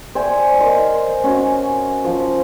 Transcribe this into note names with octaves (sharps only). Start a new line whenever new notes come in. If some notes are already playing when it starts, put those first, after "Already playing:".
C5 D5 E5 G#5
A#4 C5 D#5
C#4 F#4
F3